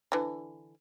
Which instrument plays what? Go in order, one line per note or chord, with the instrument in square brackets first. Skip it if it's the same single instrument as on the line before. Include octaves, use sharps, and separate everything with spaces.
[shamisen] D3 E3